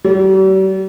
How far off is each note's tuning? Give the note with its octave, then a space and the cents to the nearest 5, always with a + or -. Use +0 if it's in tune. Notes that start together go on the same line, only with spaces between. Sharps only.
G3 -45